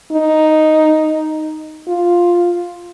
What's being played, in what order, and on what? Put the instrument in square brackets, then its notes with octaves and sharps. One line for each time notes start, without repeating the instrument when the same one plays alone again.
[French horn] D#4
F4